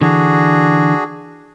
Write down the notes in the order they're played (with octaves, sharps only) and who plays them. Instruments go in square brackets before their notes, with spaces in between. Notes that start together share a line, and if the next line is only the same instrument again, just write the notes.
[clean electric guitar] D3 E3 [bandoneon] D4 F#4 G#4